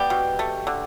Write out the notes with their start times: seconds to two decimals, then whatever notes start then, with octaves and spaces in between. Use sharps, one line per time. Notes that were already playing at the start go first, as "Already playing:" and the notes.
Already playing: G3 B3 G4
0.10 B2
0.39 A3
0.67 D3